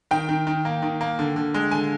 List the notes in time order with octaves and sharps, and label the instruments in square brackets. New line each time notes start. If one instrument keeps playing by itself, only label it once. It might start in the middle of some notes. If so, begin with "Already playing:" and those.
[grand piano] D#3 G5
D#3
D#3
A#3
D#3
A#3
D3
D3
G#3
D3 G#5